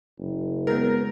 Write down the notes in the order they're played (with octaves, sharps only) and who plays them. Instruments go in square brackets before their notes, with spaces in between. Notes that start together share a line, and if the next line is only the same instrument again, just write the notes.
[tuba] F#1
[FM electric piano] G#3 B3 [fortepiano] A#4